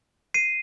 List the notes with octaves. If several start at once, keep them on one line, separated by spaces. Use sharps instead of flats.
C7 D#7